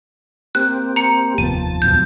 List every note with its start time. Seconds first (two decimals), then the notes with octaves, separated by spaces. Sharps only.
0.55 A#3 C4 G4 F#6
0.96 A#5 C#7
1.38 F1 D#2 A#2 F3 B3 A5 D#7
1.82 C#2 F#2 B2 G6